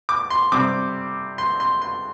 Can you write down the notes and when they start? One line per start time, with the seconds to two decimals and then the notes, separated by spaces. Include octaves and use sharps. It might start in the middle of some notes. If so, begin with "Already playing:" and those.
0.09 D6
0.30 C6
0.52 C3 G3 C4 D6
1.38 C6
1.60 C6
1.82 C6